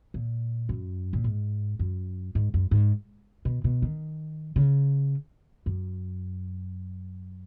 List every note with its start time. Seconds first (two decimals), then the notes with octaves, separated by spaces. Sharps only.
0.14 A#2
0.69 F#2
1.13 A#2
1.24 G#2
1.79 F#2
2.35 G#2
2.54 F#2
2.71 G#2
3.45 B2
3.64 B2
3.82 D#3
4.56 C#3
5.66 F#2